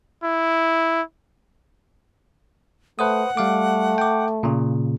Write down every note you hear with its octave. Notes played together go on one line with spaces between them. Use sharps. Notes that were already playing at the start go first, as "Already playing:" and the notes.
E4
A3 B4 C5 F#5 D#6
G3 A3 F5 D6
G5 D6
A#2 C#3